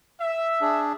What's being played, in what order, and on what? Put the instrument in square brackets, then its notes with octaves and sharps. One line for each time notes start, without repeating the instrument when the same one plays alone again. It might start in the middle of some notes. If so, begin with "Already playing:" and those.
[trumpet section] E5
[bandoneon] D4 G#4